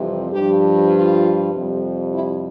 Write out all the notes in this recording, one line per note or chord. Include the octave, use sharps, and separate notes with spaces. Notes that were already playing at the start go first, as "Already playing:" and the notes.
Already playing: F2 C3 E3 G3
G2 F3 G4
F4
F2 C3 G3
E4